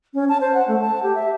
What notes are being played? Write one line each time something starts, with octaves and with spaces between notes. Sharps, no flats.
C#4
A5
C5
F#5
A3
A5
G4
E5